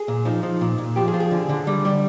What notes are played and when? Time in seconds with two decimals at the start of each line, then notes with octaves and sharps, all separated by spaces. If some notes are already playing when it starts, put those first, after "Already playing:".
Already playing: G#4
0.08 A#2
0.25 F3 D#4
0.43 F3
0.61 A#2
0.78 A#2
0.96 F3 G4
1.08 G#4
1.14 F3
1.20 G#4
1.31 D3
1.49 D3
1.67 G3
1.85 G3